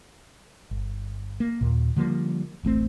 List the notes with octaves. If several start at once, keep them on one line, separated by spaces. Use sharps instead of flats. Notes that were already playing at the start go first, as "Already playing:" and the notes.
G1
A#3
D#2 A#2
D3 F3 G3 A#3
D1 A1 A3 C4